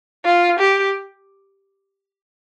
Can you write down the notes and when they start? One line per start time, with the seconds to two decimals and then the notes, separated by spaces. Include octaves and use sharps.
0.25 F4
0.59 G4